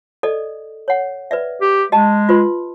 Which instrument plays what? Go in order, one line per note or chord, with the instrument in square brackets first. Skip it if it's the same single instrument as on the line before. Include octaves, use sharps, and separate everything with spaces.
[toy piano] A4 D5 D#5
C#5 F#5
B4 D5 E5
[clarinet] G4
[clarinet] G#3 [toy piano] G4 D#5 A5
[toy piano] F4 B4 C6